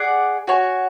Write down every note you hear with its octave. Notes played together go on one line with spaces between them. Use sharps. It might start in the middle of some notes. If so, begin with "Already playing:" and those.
Already playing: G#4 D5 F#5
F#4 C#5 G#5